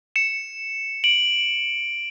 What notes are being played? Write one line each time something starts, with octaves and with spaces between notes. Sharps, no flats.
C#7 E7
D7 F#7